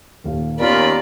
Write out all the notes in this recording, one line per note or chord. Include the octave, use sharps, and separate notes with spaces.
D#1 D#2 F5
D#2 B3 C#4 F4 A#4 D5 B5